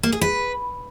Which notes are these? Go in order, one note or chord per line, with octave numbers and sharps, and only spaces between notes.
A#3
G#4
B4